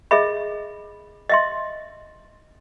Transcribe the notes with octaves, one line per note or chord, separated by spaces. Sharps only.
G#4 D#5 E5 B5
D#5 E5 C6